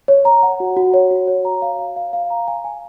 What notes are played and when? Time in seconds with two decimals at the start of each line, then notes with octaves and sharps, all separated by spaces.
0.08 C#5
0.25 A#5
0.43 F#5
0.60 F#4
0.77 F#4
0.94 C#5
1.11 F#4
1.28 C#5
1.45 A#5
1.62 F5
1.79 F5
1.96 F5
2.13 F5
2.30 A#5
2.48 G#5
2.65 G#5